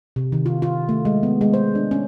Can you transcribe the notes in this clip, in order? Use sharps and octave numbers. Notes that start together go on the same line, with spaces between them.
C3
D#3
F4
F4
A3
G#3
B3
G#3
C5
D4
C#4